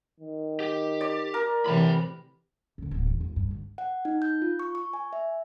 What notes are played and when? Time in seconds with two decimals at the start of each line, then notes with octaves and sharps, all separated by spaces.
0.20 D#3
0.60 G4
1.01 D5
1.34 A#4
1.66 A2 C3 E3 G5 B5
2.78 F#2 D3
2.91 D1 B3
3.07 E2
3.21 G1
3.36 G2
3.51 D2
3.78 F#5
4.05 D#4
4.22 G6
4.42 F4
4.59 C#6
4.75 C#6
4.93 G#5
5.13 E5